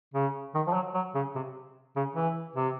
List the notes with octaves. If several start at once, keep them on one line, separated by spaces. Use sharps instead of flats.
C#3
D#3
F3
F#3
F#3
C#3
C3
C#3
E3
C3